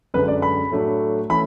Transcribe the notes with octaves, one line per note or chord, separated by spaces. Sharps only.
F#2 D3 G#3 B4
D5
B5
A2 F#3 A3 D4
E3 A3 C#4 E4 B5